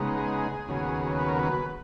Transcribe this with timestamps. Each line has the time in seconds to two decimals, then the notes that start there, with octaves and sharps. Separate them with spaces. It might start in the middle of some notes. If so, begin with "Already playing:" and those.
Already playing: C#3 G#3 B3 D#4
0.17 G#4
0.68 D#2 C#3 F#3 B3
1.19 B4
1.28 A#4
1.39 B4